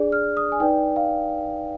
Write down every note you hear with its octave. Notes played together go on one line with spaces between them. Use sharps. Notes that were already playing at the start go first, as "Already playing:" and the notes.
Already playing: D4 G#4 D5
F6
D#6
G#5
D#4 B4 D5 G5
F5